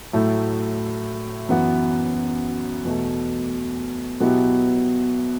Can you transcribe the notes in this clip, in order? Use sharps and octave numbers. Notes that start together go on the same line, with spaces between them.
A2 F#3 A3 E4
F#2 E3 B3 F#4
E2 B2 A3
B2 F#3 B3 E4 G4